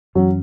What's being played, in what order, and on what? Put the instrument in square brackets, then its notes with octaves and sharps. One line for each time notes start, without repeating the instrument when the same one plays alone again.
[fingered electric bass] F#2 E3 C#4 [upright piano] F#3